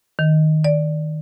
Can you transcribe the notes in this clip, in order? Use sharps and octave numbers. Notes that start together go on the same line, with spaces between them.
D#3
D5